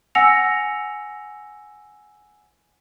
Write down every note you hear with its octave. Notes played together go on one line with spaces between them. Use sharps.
F#5 G#5 E6 A#6 C#7 F7